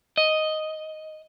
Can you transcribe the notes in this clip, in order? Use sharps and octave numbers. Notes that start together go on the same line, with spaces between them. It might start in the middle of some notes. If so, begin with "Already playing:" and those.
D#5